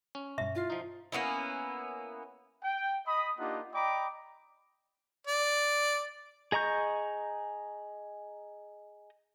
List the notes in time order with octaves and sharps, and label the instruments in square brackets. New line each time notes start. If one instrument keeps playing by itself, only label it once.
[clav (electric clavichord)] C#4
[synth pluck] G2 B2 [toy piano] E5
[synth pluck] E4 A6 C7 [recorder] F4
[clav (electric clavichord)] F3 D#4
[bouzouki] A#3 B3 C#4 E4
[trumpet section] G5
D#5 B5 D#6
A#3 D4 D#4 F4 G4 F#5
D5 D#5 G5 A#5 B5 D6
[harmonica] D5
[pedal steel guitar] G#4 D#5 A#5 C#6 G6